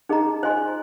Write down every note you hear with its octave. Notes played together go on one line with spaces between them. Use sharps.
D#4 G#4 D#5 A#5
F4 C5 D#5 G#5 C6